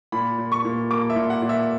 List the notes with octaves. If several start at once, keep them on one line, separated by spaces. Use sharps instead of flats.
A#2 B5
A#2
C#6
A#2
A#3 D6
E5
A#2
F#5
A#2
E5